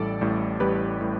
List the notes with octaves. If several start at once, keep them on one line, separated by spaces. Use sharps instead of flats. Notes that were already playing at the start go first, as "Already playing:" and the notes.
Already playing: A1 A2 G3 A4 D5
A1 A2 G3
A1 A2 G3 G4 B4
A2 G3